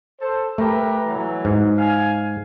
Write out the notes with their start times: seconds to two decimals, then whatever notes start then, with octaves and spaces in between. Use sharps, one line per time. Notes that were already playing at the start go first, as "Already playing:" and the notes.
0.21 A4 C5
0.58 A3 G4 A#4 B4
1.06 E3 F#3
1.45 G#2
1.78 F5 G#5